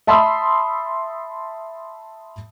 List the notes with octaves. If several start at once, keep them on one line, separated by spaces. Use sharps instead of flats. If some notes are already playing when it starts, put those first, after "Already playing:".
E5 A5 B5 C6 D#6 E6